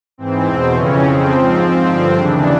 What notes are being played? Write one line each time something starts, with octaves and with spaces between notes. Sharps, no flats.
G#2 E3 C4
E2 B2 C4
F2 C#3 E3 C#4
F2 C#3 F3 C4
G#2 F3 C4
G#2 F3
G2 D3 F3
D#2 C#3 E3 D4